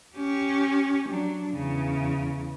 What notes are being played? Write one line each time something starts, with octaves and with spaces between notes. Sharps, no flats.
C#4 G4
F#3 D4
E2 C#3